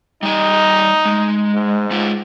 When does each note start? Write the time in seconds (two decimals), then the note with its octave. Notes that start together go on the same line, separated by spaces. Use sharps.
0.23 G3 D#4 D#5
1.05 G#3
1.54 G#2
1.91 G#3 F4